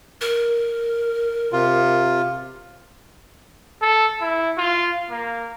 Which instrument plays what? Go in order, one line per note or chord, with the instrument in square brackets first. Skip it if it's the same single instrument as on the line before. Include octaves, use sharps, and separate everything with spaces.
[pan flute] A#4
[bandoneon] C3 F4
[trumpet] A4
E4
F4
A#3